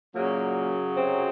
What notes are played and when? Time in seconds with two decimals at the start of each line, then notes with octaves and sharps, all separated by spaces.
0.14 F#2 A#2 C#3 F#3 A#3
0.95 C3 C4